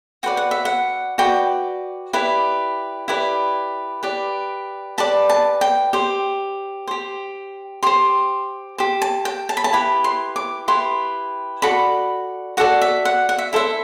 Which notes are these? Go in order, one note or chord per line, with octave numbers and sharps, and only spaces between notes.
F#4 B4 D5 G5
F#5
E5
F#5
F#4 B4 D5 G5
E4 G4 B4 D5
E4 G4 B4 D5
G4 B4 D5
G4 B4 D5 A5
A5
G5
G4 C5
G4 C5
G4 C5 C6
G4 C5
A5
G5
A5
B5
A5
E4 G4 B4 B5
C6
D6
E4 G4 B4 C6
F#4 A4 D5 B5
F#4 A4 D5 F#5
E5
F#5
F#5
E5
E4 A4 C5 E5